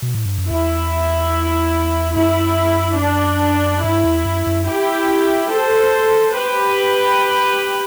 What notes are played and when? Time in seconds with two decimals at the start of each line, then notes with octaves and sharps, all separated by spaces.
0.02 B2
0.15 A2
0.26 G2
0.38 F#2
0.50 E2 E4
2.17 F#2 E4
3.00 D4
3.83 G2 E4
4.04 E2
4.26 F#2
4.47 F#2
4.67 E4 G4
5.50 A4 C5
6.33 G4 B4